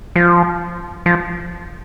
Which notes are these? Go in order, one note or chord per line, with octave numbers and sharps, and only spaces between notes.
F3
F3